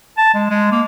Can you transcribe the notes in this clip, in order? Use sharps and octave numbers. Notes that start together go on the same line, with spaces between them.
A5
G#3
G#3
A#3